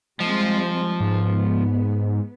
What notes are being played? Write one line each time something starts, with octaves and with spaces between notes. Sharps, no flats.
F3 G3 G#3 C4
G#2 B3